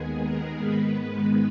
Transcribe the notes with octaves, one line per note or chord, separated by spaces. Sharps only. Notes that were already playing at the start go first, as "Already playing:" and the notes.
Already playing: D#2 D#3 G#3 B3 G#4
A#4
G#2 D#3 G#3 B3 B4